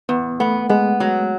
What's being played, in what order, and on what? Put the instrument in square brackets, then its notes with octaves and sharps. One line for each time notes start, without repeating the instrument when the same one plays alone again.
[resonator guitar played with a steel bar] E2 [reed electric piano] B3
[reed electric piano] A3 [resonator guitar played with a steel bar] B3
[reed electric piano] G#3 [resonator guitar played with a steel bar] B3
[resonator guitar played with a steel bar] F#3